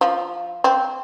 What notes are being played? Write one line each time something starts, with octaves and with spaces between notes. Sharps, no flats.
F3
C4